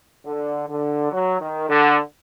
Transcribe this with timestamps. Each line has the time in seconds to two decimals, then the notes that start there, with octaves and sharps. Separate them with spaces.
0.24 D3
0.67 D3
1.11 F#3
1.40 D#3
1.68 D3